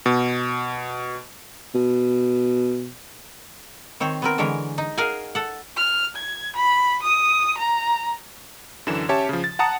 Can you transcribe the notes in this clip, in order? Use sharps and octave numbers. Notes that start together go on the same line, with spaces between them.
B2
B2
D#3 C4 C5 C#5
B3 C4 A#4
D3 E3 G#3 A#4 C#5
D#4
G#4 A#4 F5 F#5 G#5
A4 F#5
F6
G#6
B5
D#6
A#5
F#2 D3 E3 E7
C#4 G4 C#5 E5 A5
C#3 F3
A6
F#5 A5 A#5 D#6 C#7